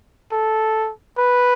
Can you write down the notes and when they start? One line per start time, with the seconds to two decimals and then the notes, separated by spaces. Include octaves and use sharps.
0.32 A4
1.18 B4